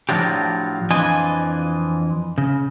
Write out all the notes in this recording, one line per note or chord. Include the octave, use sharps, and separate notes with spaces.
A2 F3 F#3 D4 F4 G4
F2 E3 D4 F4 D#5 G#5
C#3